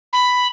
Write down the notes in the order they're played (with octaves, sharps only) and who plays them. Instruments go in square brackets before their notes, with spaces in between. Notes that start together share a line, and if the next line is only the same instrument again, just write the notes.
[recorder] B5